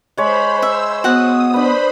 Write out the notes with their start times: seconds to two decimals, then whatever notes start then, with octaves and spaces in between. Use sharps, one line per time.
0.17 G#3 C5 C#5 B5
0.62 C5 E5 E6
1.04 B3 F#4 F#5 D#6
1.54 D4 B4 C5 B5